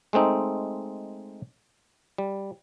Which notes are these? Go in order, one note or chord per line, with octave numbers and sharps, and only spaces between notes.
G#3 A3 C4 D#4
G3